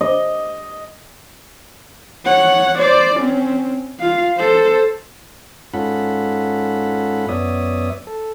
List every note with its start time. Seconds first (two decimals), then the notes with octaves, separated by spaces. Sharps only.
0.01 D#5
2.25 C#5 F#5
2.79 C5 D5
3.16 C4 C#4
3.99 F4 F5
4.38 A4 C5
5.74 G#2 C#4 F4 A4 F#5 B5
7.29 F#2 B3 C#5 D5 E5 D#6
8.07 A4